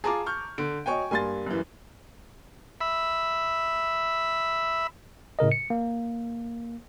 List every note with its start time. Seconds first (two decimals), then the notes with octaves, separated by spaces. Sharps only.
0.04 F4 G#4 A5 A#5 D6
0.26 C#6 F6 G6
0.58 D3 D7
0.86 F#4 C#5 D#5 G5 G#5 C#6
1.11 G2 A#3 G#5 C6 A6
1.46 F#2 E3
2.81 E5 B5
5.39 A2 C#3 A#4 D#5
5.52 C#7
5.70 A#3